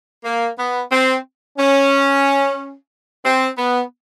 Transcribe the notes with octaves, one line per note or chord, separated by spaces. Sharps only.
A#3
B3
C4
C#4
C4
B3